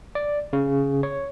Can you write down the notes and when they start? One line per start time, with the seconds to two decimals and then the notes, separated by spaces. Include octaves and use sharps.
0.15 D5
0.53 C#3
1.03 C#5